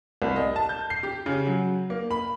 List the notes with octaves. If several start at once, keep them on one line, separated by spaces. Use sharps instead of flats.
C2
D#5
A5
G6
C7
G4
C#3
F#3
A#3
B5